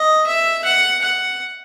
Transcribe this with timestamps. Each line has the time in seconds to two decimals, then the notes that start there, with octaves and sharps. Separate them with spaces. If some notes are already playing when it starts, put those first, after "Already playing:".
Already playing: D#5
0.27 E5
0.65 F#5
1.02 F#5